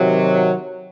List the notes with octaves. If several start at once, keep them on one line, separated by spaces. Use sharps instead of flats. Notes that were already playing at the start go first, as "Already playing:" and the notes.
Already playing: C3 D#3 F#3